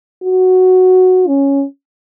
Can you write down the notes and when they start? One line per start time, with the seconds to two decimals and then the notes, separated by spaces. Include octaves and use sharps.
0.23 F#4
1.27 C#4